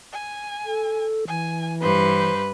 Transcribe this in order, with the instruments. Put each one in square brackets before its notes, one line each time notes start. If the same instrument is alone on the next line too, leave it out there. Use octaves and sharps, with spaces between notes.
[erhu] G#5
[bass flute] A4
[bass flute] E3 [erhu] G#5
[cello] G2 [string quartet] B4 [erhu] C5